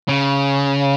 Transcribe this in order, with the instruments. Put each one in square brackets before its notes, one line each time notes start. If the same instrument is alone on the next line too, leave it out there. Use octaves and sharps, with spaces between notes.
[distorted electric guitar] C#3